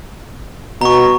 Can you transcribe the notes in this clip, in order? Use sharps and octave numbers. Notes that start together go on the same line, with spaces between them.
B2 A#5 C#6